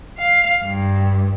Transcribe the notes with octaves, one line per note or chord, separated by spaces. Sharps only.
F5
G2